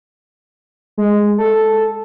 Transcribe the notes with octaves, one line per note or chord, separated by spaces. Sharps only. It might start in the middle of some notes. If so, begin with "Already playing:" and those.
G#3
A4